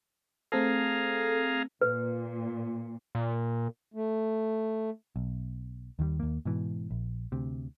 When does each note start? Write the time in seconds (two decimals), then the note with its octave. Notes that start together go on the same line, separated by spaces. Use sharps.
0.52 A3 C4 G#4 A4 F5 A#5
1.81 A#2 B4
3.15 A#2
3.94 A3
5.16 B1
5.99 D#2 D#3 F3 G3
6.20 D#2 A#3
6.45 G#2 B2 E3
6.91 A#1
7.32 D2 C3